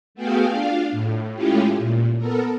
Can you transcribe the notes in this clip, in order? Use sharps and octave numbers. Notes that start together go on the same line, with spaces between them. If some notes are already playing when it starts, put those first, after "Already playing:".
A3 B3 F#4 G#4 F5 G5
D4 F4 F5
A2
G#3 A3 C#4 E4 F4 G4
A#2
B3 A4 A#4